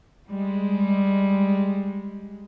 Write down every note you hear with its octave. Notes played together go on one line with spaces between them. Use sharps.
G3 G#3